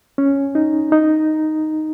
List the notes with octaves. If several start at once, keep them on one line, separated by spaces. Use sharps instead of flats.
C#4
D#4
D#4